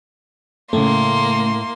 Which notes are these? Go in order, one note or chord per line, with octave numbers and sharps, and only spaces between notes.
A2 C#3 A3 A#3 C6